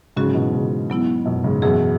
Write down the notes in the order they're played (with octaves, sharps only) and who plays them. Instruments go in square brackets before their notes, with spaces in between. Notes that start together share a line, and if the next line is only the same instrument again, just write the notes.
[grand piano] G#2 C#3 [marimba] F#3 C#4 F#4
[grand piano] B2 E3
G#2 C#3
[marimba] F#3 B3 E4
[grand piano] F#2 B2
G#2 C#3
[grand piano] F#2 B2 [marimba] E3 B3 G#4